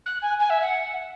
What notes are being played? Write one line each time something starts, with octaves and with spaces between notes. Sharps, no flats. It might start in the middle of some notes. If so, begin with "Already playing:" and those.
F#6
G#5
G#5
E5
F#5